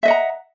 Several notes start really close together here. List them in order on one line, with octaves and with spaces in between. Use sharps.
E5 D#5 F#5 A#5